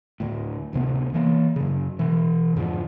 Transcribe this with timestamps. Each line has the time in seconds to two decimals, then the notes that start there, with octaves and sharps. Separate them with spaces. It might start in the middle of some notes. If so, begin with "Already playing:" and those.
0.20 D2 A2
0.73 D1 D2 C3 B3
1.14 E3 A#3
1.56 F#2 C#3
1.99 B2 E3
2.55 F2 G#2 D3 F3